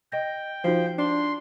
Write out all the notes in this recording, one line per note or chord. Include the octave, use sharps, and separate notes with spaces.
D#5 G5 A#6
F3 D#4 F#4 G6
D4 C6